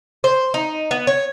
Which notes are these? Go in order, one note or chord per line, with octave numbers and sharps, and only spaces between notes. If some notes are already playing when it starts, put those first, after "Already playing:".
C5
D#4
B3
C#5